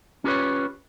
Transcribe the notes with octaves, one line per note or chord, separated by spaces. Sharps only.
C#4 F4 G4 A#4 B4 C#5